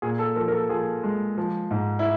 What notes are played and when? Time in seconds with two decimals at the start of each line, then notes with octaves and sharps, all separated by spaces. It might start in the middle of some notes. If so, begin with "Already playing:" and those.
0.02 A#2 G#4
0.19 A4
0.36 F3 A#4
0.48 A#4
0.53 A4
0.69 F3 G#4
1.03 G#3
1.38 F3
1.71 G#2
1.99 E4